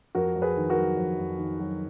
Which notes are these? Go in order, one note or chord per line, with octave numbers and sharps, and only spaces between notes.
F2 F#4 A#4
F2
G#4 B4
D#3
F#4 A#4
F#3
F2
F2
D#3
F#3